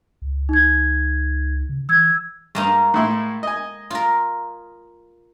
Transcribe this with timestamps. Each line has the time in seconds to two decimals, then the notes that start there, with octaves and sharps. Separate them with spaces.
0.22 C#2
0.49 D#4 G#6
1.69 C#3
1.89 E3 E6 G#6
2.55 G2 G#3 A#3 D#4
2.94 A2 E4 C6
3.43 D#5 G#5
3.90 F4 A#4